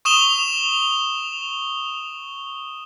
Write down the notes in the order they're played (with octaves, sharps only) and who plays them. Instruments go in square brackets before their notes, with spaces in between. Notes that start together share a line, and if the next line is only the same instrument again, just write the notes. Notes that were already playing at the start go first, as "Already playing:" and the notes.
[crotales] C#6 D#6 E7 F7 G7